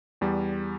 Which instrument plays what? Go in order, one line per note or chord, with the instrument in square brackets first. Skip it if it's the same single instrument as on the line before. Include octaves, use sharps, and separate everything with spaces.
[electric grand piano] E2 G3